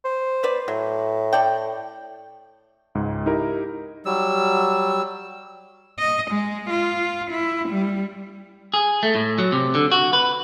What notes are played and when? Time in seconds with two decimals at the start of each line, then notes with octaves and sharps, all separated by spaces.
0.05 C5
0.43 B3 B4 D5
0.68 A2 F#3
1.33 A4 D5 G5
2.95 C#2 G#2
3.26 D#4 E4 G4 A#4
4.06 F#3 G3 E6
5.99 D#5
6.31 G#3
6.70 F4
7.31 E4
7.69 G3
8.74 G#4
9.03 A3
9.15 A2
9.38 F#3
9.52 C3
9.75 D3
9.92 F#4
10.13 B4